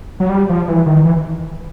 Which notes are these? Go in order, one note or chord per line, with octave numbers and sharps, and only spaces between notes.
F#3
G3
F3
E3
D#3
E3